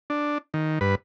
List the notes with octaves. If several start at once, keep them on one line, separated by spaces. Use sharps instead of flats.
D4
D#3
G2 B4